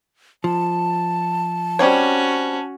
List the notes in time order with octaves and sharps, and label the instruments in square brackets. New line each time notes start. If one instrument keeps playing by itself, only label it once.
[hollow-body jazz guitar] F3 [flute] A5
[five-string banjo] G3 C4 C#5 [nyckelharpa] C#4 F#4